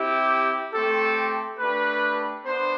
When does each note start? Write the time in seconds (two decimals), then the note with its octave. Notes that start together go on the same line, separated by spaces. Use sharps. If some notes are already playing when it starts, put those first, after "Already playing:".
Already playing: C4 E4 G4
0.72 A3 C4 G4 A4
1.59 A3 D4 G4 B4
2.45 B3 D4 C5